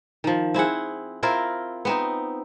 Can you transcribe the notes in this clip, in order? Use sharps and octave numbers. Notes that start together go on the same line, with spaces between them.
D#3 F3
C4 E4 G#4 F#5
C4 E4 F4 A#4
B3 C4 D#4